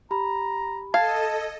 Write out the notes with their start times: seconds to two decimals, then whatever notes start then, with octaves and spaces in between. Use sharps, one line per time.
0.11 G4 A#5 B5
0.94 A4 D#5 F5 A5 G#6